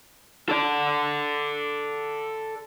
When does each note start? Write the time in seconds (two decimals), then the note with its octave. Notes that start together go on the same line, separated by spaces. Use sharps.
0.49 A4 D5